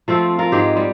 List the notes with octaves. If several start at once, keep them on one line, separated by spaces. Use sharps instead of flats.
F3 A3 C4 F4
F4 A#4
G#2 G#3 G4
G3